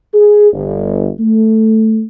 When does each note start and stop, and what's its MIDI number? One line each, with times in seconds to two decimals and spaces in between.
0.14 0.50 68
0.52 1.09 31
1.19 2.04 57